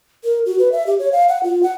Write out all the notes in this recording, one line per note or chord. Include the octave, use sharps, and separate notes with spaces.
A#4
F#4
B4
E5
G4
C#5
F5
F#5
F4
F#5